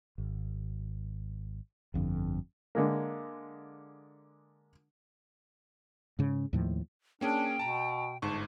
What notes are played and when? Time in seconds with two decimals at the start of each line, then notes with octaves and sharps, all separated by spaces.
0.18 G#1
1.94 G1 F2 D3
2.75 D3 G#3 A#3
6.19 G#2 C#3
6.53 D#2 A2 F3
7.21 A#3 C#4 D4 G#4 G5
7.59 B2 A5 A#5
8.22 G1 G#2 A5 C#6